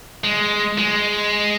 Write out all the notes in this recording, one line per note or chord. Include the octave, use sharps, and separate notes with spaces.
G#3
G#3